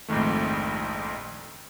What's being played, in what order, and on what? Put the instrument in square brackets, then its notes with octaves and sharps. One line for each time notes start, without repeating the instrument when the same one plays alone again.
[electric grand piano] A#1 F2 G#2 D#3 A3